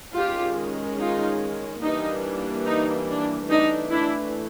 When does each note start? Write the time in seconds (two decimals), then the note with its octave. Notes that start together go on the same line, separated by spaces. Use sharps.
0.15 D#3 G#3 C#4 F4 G4
0.99 D#4 F4
1.83 E3 G3 A#3 D4 D#4
2.66 D#4
3.08 D4
3.49 E3 A3 D4 D#4
3.91 D4 E4